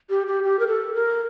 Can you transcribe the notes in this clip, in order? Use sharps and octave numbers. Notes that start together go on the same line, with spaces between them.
G4
G4
G4
A#4
A4
A#4